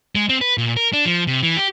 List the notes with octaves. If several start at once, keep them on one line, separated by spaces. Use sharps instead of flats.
G#3
C4
B4
A#2
A#4
D4
F3
C3
E3
G4